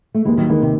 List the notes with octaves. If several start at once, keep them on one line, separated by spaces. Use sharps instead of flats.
A3
D#2 E3 G#3
D#3 F#3
D#3 E3 G#3
C3